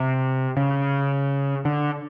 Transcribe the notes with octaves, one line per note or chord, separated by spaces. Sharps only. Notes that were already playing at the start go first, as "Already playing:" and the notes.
Already playing: C3
C#3
D3